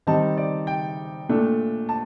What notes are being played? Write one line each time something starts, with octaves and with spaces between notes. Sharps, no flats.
D#3 G3 C4 D#4 A5
D5
G5
A#2 A3 D4
A5